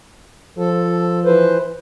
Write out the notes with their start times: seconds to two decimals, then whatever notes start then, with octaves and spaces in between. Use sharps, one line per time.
0.58 F3 A4
1.25 E3 B4 C5